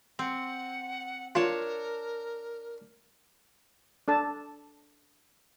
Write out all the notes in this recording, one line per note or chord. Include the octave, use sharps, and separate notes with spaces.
C4 F#5
D4 F4 A#4 C#5 A5
D4 A4 A5